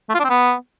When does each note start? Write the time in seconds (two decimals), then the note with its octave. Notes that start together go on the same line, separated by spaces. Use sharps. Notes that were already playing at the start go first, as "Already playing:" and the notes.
0.09 A3
0.14 F4
0.19 D4
0.24 C4
0.29 B3